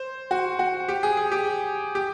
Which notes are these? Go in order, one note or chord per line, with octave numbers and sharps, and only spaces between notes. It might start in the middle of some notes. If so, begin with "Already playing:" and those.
Already playing: C5
F#4
F#4
G4
G#4
G#4
G4
G4